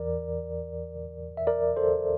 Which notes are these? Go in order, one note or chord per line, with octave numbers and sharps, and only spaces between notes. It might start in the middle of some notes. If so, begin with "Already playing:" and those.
Already playing: E2 E3 A#4 D5
E5
A#4 D5
A4 C5